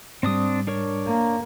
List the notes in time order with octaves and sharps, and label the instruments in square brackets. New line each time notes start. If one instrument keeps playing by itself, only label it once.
[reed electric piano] G#2 G3 [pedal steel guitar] C4 D4 D#6
[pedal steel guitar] D4 A#4 C#5
[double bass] A#3